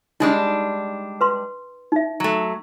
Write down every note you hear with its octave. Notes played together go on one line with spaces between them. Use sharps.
G3 G#3 D4 D#4
B4 C6
D#4 E5
F#3 A3